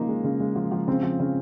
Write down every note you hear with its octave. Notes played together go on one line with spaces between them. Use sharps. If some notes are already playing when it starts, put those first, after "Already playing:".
Already playing: C#3 F3 A#3 D#4
G#3
C#3
G#3
F3
F3
C#3 C4
F3
C#3